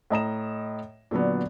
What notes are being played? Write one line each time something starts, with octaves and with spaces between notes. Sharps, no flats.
A2 D#5 A#5 E7
A#2 D3 F#3 B3